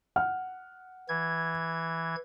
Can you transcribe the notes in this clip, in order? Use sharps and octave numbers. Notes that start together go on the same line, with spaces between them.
F#5 F6
E3 G#6